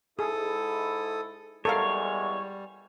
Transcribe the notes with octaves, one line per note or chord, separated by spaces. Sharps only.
G#2 E4 G#4 A4 D#6
E2 G3 G#3 A4 A#4 C#5 F5